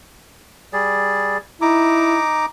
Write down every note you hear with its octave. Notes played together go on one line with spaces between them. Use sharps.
G3 G#4 D5
D#4 E4 A#5 D6